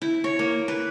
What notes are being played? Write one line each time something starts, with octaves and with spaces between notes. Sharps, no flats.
E4
C#5
A#3
B4